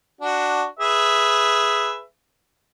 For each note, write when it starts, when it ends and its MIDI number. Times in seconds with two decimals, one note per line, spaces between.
0.21 0.64 62
0.21 0.64 66
0.80 2.00 68
0.80 2.00 71
0.80 2.00 76